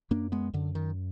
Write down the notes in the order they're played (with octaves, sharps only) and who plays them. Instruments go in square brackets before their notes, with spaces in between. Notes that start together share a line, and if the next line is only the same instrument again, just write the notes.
[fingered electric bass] F#2 A#3 D4
G#3 B3
F#2 D3
D#3